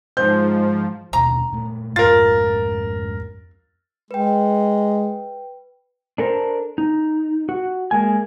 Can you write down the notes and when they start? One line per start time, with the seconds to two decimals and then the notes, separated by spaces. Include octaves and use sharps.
0.17 G#2 F3 C5 G6
1.13 D#2 B2 D4 A#5
1.52 A#2 A3
1.96 F2 G#2 F4 A#4 A6
4.11 G#3 B4 G5
6.18 D4 A4 A#4 C5
6.78 D#4
7.49 F#4
7.91 G#3 A#3 G#5